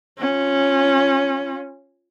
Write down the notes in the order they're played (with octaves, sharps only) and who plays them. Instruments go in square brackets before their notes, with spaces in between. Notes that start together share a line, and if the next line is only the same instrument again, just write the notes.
[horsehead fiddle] C#4 F4